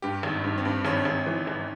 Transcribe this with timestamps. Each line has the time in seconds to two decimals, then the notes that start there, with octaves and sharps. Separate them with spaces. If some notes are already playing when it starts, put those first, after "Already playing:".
0.02 G2 G4
0.23 G#1
0.44 G2
0.58 C4
0.65 G2
0.85 G#1 C#4
1.05 G#1
1.27 E3
1.47 G#1